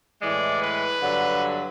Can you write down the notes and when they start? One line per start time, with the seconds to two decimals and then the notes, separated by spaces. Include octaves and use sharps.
0.21 A2 E3 G#3 D5
0.61 B4
1.01 G2 D3 F#3